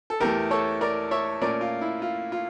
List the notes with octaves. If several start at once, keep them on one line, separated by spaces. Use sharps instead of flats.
A4
E2 E3 A3 G4 A#4
A4 C#5
A#4 D5
C#5 E5
A#2 A3 C#4 A#4 D5
F4
E4
F4
F4